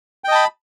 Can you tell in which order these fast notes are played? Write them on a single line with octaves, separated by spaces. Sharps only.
G5 D#5 A5 B5